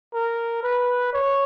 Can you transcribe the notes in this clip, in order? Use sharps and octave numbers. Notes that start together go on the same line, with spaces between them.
A#4
B4
C#5